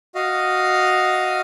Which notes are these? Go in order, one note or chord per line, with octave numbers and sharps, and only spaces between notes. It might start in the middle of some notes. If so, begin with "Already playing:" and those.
F#4 D#5 F5